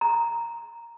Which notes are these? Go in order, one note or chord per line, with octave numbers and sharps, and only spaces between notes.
A#5